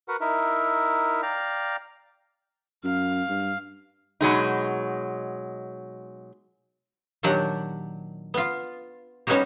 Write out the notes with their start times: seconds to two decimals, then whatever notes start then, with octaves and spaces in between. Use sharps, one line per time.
0.08 F#4 A#4 B4 F#5
0.21 D#4 E4 A#4 E5
1.22 D5 F5 G5 A#5
2.84 F#2 F5
3.29 G2
4.21 B2 F#3 G#3 D#4
7.23 A#2 D#3 F#3 D4 G4 F#5
8.34 B3 F4
9.27 G3 B3 C#4 D#4 F#4 G4